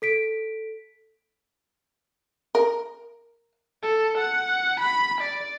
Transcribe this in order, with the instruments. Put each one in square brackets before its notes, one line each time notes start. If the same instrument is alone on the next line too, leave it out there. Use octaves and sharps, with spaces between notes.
[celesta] A4 B6 D7
[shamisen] A#4
[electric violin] A4
F#5
B5
D5